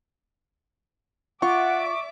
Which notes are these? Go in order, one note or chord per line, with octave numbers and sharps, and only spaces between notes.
F4 D5 E5 F#5 C#6 D6